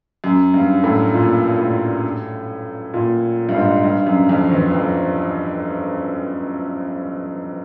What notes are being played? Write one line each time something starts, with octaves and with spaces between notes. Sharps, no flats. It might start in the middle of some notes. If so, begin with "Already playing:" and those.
F#2
G2
A2
A#2
A2
A#2
G2
G#2
G2
F#2
F2
E2
F2